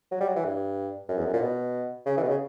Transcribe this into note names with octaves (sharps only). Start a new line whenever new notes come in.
F#3
G3
F#3
E3
G2
F#2
E2
F#2
A#2
B2
C#3
E3
B2
C#3